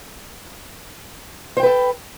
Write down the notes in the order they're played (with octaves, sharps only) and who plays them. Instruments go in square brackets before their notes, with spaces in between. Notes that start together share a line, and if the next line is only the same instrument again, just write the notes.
[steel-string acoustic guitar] C5
G5
B4
A4